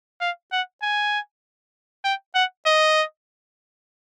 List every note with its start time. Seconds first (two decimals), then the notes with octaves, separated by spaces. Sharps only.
0.21 F5
0.52 F#5
0.82 G#5
2.04 G5
2.35 F#5
2.66 D#5